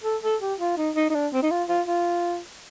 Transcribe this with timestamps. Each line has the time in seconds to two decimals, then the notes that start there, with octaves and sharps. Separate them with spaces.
0.04 A4
0.23 A4
0.41 G4
0.60 F4
0.78 D#4
0.96 D#4
1.10 D#4
1.15 D4
1.33 C4
1.43 D#4
1.51 F4
1.69 F4
1.87 F4